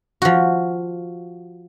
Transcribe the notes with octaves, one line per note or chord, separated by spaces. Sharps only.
F3 F#4